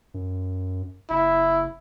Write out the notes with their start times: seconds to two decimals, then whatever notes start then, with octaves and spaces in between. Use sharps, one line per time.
0.14 F#2
1.10 F#1 E4